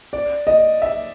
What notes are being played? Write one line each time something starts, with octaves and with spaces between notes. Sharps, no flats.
D5
D#5
E5